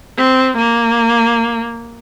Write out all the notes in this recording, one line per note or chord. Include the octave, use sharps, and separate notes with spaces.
C4
A#3